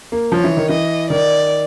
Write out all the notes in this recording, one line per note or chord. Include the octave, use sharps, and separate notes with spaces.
A#3
F3 C#5
E3
D#3
E3 D#5
D#3 D5